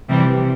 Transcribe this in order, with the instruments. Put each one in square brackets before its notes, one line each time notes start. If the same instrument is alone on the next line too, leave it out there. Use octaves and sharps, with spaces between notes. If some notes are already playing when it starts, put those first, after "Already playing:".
[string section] C3 E3 G3 C4